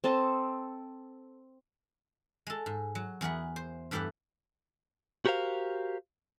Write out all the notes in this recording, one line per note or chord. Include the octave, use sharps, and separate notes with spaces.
C4 A4 D#5 A5
G#3 A4
G#2
F#3
E2 G#4 A#4 F#5 B5
C5
G2 E3 A3 G4 B4 F#5
F#4 G4 A#4 C5 F5